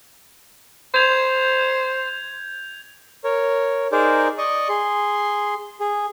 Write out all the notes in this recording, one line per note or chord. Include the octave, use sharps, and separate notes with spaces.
C5 G6 G#6 F7
A#4 C#5
D#4 G#4 A#4 C5 D5
D5 D#5 C#6 D#6
G#4 C6
G#4